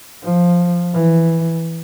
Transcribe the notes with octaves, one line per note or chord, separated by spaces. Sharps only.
F3
E3